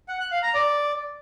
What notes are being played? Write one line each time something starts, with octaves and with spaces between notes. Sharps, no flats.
F#5
F#6
F5
A#5
D5